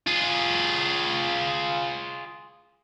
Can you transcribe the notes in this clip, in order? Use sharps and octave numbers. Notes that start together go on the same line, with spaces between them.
F4 G#4